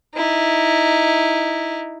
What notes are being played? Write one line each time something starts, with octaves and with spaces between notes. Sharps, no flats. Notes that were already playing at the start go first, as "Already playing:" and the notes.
D#4 E4